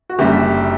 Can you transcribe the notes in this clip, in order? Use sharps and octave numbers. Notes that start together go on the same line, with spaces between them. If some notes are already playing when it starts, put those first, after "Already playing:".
F#4
F#1 F#2 D3 G3 G4